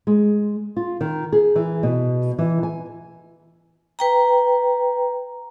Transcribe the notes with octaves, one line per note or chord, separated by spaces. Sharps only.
G#3
F4
D#3
G#4
E3
B2
E3
G#5
B4 G5 A#5